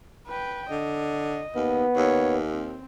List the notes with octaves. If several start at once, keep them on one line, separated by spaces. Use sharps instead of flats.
B4 G5
D3 D#5
D#2 B3
D#2 C#5
C4